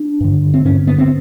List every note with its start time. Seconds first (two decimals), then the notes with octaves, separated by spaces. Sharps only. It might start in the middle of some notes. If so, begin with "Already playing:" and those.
Already playing: D4
0.20 G2 D3
0.54 C4
0.65 G2 D3 C#4
0.87 B3
0.98 C4